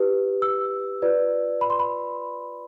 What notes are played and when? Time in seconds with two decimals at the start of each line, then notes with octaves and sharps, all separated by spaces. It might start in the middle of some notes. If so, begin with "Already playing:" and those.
Already playing: E4 G4 B4
0.42 E6
1.02 F4 B4 D5
1.61 B5
1.70 C6
1.79 B5